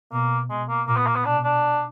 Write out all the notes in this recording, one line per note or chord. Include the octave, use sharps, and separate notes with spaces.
B2 A#3
B2 G#3
A#3
A#2 A#3
B3
A#3
B3
B2 D4
D4